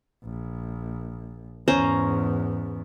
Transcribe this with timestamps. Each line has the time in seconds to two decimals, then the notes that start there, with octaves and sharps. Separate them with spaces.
0.24 A#1
1.68 E2 G#2 C#4 C5 A#5